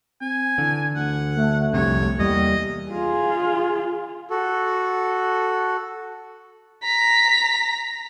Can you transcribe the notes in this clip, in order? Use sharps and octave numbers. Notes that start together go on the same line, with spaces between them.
C4 G#5
D3 E3
D2 F#5
A3
C2 F2 C3 G3 C#5
E2 G3 A#3 D#5
F4 G#4
F#4 A4
A#5 B6